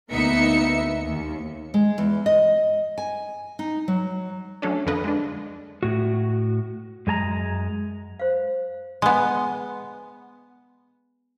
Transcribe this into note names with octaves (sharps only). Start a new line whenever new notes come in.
D2 A#3 B3 D#4 E5 C#7
D#2
G#3
E2
D#5
G#5
D#4
F#3
F#3 A3 C#4 D4
F2 D3 A#3 A4 B4 D#5
G#3 D4
A2 F#4
F#2 G#3 A5 A#5
C5 F5
G#3 B3